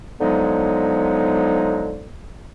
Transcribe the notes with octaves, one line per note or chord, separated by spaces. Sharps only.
D3 F3 F#3 G#3 B3 D#4